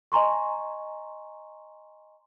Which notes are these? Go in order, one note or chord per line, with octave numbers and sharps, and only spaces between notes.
D#5 G#5 A#5 C6 C#6